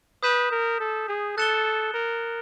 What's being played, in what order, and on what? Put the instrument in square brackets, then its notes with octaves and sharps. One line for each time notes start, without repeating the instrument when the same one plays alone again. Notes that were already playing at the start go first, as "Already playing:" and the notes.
[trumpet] B4 [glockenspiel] D#6 G6 B6 E7
[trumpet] A#4
A4
G#4
[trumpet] A4 [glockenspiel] F#6 A6 C#7 E7 G7
[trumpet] A#4